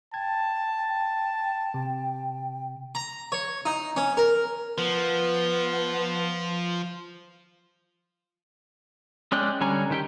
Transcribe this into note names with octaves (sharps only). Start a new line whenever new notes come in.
G5 A5 G#6
C3
A#5
C#5
D#4
C#4
A#4
F3 B3
G#3 C#4 D5 G5 F#6
D3 G3 C#4 G#5 A#5
D#3 G4 G5